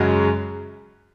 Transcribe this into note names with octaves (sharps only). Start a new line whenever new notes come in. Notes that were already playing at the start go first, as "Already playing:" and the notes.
Already playing: F#2 C#3 G#3 C#4 F#4